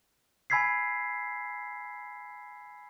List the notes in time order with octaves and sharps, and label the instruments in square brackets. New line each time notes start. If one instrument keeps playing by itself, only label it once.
[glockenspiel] G#5 B5 E6 G#6 B6 C7